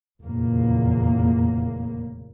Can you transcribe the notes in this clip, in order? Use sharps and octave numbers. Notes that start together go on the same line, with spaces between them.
F1 E2 A#2 C#3 A#3